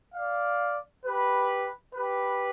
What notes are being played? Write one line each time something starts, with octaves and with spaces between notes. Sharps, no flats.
D5 F5
G4 B4
G4 B4